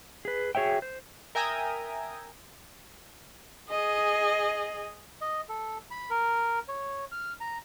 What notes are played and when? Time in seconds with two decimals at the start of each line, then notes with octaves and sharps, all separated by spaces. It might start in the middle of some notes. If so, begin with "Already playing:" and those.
0.25 G#4 B4
0.55 F#4 G#4 C#5 E5 G5
0.82 C5
1.35 A#4 E5 G5 G#5 A#5 D#6
3.69 G#4 D#5
5.21 D#5
5.49 A4
5.91 B5
6.10 A#4
6.68 C#5
7.12 F6
7.40 A#5